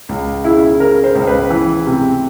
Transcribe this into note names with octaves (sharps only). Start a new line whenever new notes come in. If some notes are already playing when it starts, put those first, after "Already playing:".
C#2
C#3 E4
C#3 A#4
C5
C#2
B4
E3
C3